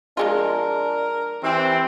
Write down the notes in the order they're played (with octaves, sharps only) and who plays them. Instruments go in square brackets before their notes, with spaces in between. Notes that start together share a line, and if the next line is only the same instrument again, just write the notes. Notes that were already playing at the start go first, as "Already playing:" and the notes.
[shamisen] F3 G#3 F4 [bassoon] D4 [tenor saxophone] A#4
[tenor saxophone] E3 [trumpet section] C4 [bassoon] G4